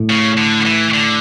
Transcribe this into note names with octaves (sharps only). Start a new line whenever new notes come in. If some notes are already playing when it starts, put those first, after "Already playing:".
Already playing: A2
C#3
D3
E3
D3